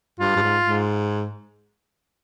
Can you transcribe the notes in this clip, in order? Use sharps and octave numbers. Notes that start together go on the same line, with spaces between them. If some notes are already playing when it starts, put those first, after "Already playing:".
G2 F4
G2
G#2
G#2